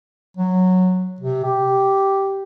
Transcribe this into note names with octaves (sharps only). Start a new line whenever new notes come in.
F#3
C3
G4